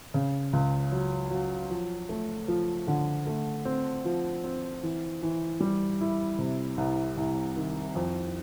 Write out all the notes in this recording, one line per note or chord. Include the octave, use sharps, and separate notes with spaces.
C#3
C#2
F#3
F#3
F3
A3
F3
D3
A3
C4
F3
C4
E3
E3
G3
E4
C3
C2
C2
D#3
F2